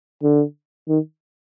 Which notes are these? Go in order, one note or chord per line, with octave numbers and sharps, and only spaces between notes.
D3
D#3